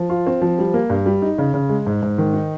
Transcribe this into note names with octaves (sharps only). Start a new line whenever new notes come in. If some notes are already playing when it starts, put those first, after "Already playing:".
Already playing: F3
F4
C4
F3
G3
A#3
G2
G3
D#4
C#3
C#3
G#3
G#2
G#2
D#3
D#4